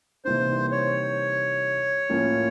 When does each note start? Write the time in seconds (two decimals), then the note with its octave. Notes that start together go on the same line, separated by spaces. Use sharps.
0.25 C3 E3 G3 A#3 D#4 C5
0.72 C#5
2.09 A2 F3 A#3 C#4 F4